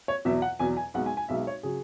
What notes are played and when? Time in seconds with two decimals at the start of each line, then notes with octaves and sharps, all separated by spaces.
0.08 C#5
0.25 E2 B2 F#3 E5
0.42 F#5
0.59 E2 B2 F#3 G#5
0.77 G#5
0.94 B1 B2 G#3 F#5
1.06 G#5
1.17 G#5
1.29 B1 B2 G#3 E5
1.47 C#5
1.63 C#3 F#3 G#4